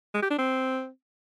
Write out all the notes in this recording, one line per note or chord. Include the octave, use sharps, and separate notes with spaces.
G#3
G4
D4
C4